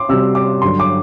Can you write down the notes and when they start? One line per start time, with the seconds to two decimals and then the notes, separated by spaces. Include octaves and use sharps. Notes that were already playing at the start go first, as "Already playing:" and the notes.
Already playing: C6 D6
0.09 C3 G3 C4 F#4 E6
0.35 D6
0.62 G2 D3 F#3 C6
0.80 D6